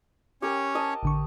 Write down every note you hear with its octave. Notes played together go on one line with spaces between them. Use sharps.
C#4 G4 A#4 C#5
A#4 D#5 A5
A1 D3 C#6